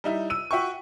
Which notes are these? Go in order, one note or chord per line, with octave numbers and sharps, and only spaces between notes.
G3 D#4 E4
E6 D#7
F#4 E5 G5 C#6